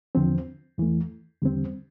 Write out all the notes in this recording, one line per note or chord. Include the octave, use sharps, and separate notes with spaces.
E2 D3 F3 C4
E2 E3 A3
E2 D3 G3 C4